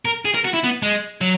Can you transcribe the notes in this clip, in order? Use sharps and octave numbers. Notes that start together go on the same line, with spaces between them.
A#4
G#4
A#4
F#4
E4
B3
G#3
F#3